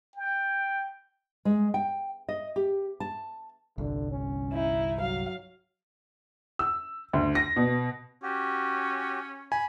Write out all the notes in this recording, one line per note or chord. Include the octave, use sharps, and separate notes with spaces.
G5
G#3
G5
D#5
G4
A5
G1 C2 D3
C#4
D#4 E4
F#3 F5
E6
D2
A#6
B2
C#4 F#4 G4
G#5 B5